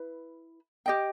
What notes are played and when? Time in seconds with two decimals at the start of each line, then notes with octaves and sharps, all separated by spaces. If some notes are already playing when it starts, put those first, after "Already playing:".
Already playing: E4 B4
0.86 G4 D#5 G5